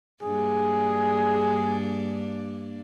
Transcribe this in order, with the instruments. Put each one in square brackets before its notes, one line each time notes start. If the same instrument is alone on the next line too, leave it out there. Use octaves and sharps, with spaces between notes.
[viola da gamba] G2 A#3 D4 [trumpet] G#4